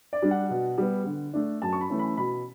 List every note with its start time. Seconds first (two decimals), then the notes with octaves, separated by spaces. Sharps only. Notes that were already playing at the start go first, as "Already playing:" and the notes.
0.13 D5
0.22 G3 D4
0.31 F#5
0.50 B2
0.78 G3 B3
1.06 D3
1.33 A3 D4
1.62 F#2 A5
1.73 C#6
1.81 B5
1.90 E3 A3 C#4
1.99 B5
2.17 B2 B5